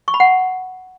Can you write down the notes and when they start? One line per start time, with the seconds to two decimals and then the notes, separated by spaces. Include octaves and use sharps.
0.08 C#6
0.14 B5
0.20 F#5